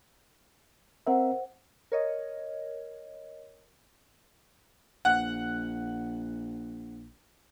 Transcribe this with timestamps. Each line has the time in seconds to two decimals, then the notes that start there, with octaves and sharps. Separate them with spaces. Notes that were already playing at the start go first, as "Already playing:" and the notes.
1.07 C4 A#4 C5 E5 F#5
1.92 A#4 C#5 D#5
5.05 A#1 F#5